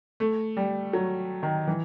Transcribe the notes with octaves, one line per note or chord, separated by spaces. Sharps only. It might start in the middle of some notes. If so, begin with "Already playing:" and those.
A3
G3
F#3
D#3
E3